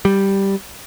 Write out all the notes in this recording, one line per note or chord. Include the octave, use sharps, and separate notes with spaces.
G3